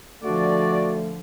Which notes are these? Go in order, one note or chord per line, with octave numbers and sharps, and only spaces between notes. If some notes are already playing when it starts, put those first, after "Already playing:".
D3 F3 A3 F#4 D5